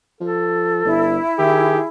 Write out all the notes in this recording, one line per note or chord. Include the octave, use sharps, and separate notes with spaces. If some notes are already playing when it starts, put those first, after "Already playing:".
F3 A4
G1 E4
D#3 G4 G#4